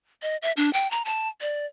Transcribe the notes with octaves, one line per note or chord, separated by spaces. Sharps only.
D#5
E5
D4
G5
A#5
A5
D5